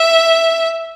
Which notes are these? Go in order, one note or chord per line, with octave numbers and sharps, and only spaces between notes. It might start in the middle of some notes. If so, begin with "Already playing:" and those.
Already playing: E5